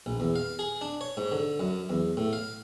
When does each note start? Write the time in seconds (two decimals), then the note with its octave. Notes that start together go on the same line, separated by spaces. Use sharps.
0.06 A#1
0.20 E2
0.36 F5
0.59 G#4
0.81 D4
1.01 C#5
1.17 G#2
1.32 D3
1.59 F#2
1.90 E2
2.17 A2
2.33 F5